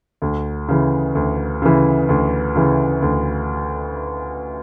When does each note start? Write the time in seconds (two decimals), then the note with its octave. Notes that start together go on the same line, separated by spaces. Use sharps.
0.22 D2
0.68 C#3 E3
1.15 D2
1.62 C#3 E3
2.09 D2
2.56 C#3 E3
3.02 D2